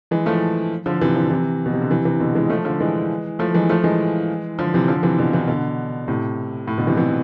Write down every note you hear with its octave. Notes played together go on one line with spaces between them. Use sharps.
E3 G#3
F3 A3
D3 F3
C3 E3
D3 F3
C3 E3
B2
C3
D3
C3 E3
C3 E3
B2 D3
E3 G#3
F3 A3
D3 F3
E3 G#3
F3 A3
E3 G#3
F3 A3
E3 G#3
D3 F3
C3 E3
D3 F3
C3 E3
B2 D3
C3 E3
B2 D3
A2 C3
A2
B2 D3
C3 E3
C3 E3